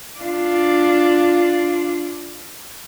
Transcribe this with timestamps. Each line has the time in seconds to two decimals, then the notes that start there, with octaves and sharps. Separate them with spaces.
0.19 D4 F4